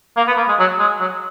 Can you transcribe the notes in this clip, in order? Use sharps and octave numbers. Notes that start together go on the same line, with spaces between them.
A#3
B3
A#3
G#3
F#3
G#3
F#3